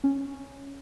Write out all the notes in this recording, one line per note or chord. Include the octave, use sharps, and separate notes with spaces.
C#4